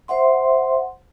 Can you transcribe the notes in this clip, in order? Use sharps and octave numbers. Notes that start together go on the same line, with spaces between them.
C5 E5 F#5 C6